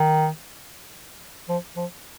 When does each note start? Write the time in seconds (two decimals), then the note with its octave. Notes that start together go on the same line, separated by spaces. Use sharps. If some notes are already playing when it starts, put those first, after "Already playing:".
Already playing: D#3
1.49 F3
1.76 F3